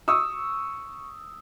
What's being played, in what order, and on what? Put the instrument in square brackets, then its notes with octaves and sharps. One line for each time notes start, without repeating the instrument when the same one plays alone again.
[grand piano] C#6 D#6 E6